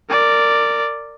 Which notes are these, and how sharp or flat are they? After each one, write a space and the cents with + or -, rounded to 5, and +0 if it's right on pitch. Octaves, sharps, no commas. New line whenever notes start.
A#4 -20 D5 +0